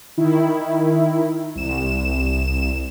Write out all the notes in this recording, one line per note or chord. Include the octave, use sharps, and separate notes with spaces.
D#3 E4
C2 E7